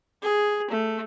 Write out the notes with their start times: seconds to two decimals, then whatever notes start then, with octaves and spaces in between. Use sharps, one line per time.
0.22 G#4
0.70 A3